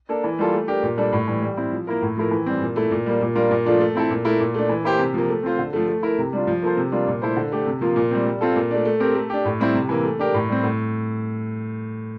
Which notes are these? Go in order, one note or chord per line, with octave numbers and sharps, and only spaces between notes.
A#3 D4 A4
E3
G3 A#3 F4 A4
A3
D4 G4 A#4
A#2
G3 D4 A4
A2
E3 G3
G3
C4 E4
F3
A#3 E4 A#4
A2
F3 A3 E4 A#4
E3
G3 C4
A#2
A3 E4
A#2
G3 A#3
A#2
G3 D4 F4 A#4
A#2
F3 A3 D4 F4
A3
C4 E4 A4
A#2
A3 E4 A#4
A#2
A3 D4
E3
A#3 E4 G4 C5
C3
F3 A#3
A3
C4 F4 C5
D3
F3 A3
A3
E4 A#4
C3
G3 D4 F4
F3
A#3 F4 A4 C5
C3
G3 A#3 D4 F4
A#2
A3 E4 A4 C5
D3
A3 D4 G4
C3
F3 A#3 F4
A#2
G3 C4
G3
C4 F4 A4
A#2
A3 D4
A3
C4 G4 A#4
A3
D4 G4
A2
G3 C4 E4
C3
E3 A#3
A3
D4 G4 A#4
A2
G3 C4
A2